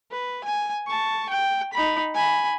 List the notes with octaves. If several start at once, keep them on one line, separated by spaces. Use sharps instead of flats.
B4
G#5
A5 C#6
G5
D#4 B5
G#5 B5